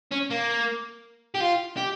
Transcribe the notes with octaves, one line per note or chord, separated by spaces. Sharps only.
C#4
A#3
G4
F4
G4